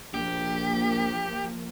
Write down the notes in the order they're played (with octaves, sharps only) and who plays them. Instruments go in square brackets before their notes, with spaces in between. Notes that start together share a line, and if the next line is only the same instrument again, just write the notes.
[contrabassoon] A#1 [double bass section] F3 A#3 [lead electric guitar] G4